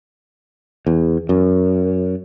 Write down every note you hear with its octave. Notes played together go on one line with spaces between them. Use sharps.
E2
F#2